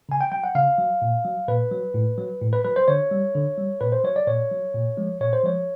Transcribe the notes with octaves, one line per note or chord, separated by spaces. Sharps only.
C#3 G#5
G5
F#3 G5
F#5
C#3 F5
F#3
A#2
F#3
A#2 B4
F#3
A2
F#3
A2
B4
F#3 B4
C5
D3 C#5
G3
D3
G3
A#2 B4
C5
F#3 C#5
D5
A#2 C#5
F#3
A#2
F3 G#3
A#2 C#5
C5
F3 G#3 C#5